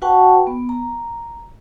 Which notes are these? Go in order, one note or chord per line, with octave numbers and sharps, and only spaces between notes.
F#4 B4 F#5 G5 A5 C#6
B3
A#5